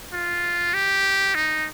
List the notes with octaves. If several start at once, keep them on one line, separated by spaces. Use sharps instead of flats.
F4
G4
D#4